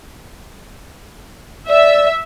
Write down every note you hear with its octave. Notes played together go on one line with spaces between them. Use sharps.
D5 E5